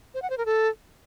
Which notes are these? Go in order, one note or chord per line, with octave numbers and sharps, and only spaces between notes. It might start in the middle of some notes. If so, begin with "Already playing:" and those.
C5
F#5
C5
A#4
A4